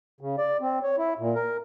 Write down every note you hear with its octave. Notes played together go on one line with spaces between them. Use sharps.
C#3
D5
C4
C#5
E4
A#2
A#4